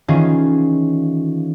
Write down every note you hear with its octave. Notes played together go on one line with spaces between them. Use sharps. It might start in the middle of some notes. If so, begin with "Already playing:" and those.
D#3 E3 C#4 F4 G#4